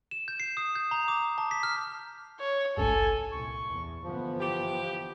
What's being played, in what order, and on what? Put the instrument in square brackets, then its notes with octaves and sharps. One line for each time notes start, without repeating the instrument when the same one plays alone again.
[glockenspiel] E7
G6
C7
D#6
G6
A#5
D6
A5
B6
F6
[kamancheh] C#5
[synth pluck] G#1 C#2 G2 [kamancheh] A4 G#5
[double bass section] C2 A#2 [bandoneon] C#6
[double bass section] E2
[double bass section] G1 E3 B3 [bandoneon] F3
[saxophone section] G4